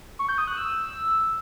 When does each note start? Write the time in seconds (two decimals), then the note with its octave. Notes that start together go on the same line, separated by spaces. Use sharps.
0.19 C#6
0.29 G6
0.38 D#6
0.47 F#6
0.57 E6